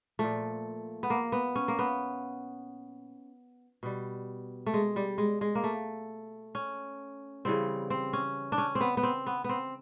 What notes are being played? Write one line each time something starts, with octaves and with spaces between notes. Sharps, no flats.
A#2 F3 A3
B3
A#3
B3
C#4
A#3
B3
B2 G3
A3
G#3
G3
G#3
G#3
A#3
A3
C#4
C#3 E3 G3 C4
C4
C#4
D4
C#4
C4
B3
B3
C4
B3
B3 C4